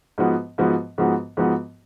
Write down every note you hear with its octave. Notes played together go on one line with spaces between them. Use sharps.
G#2 F3 B3 F#4
G#2 F3 B3 F#4
G#2 F3 B3 F#4
G#2 F3 B3 F#4